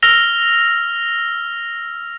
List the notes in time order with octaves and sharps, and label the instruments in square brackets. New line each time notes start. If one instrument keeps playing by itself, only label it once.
[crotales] E6 F6 A#6 F7 G7